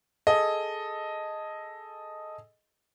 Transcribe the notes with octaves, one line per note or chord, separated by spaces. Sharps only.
G#4 A4 D#5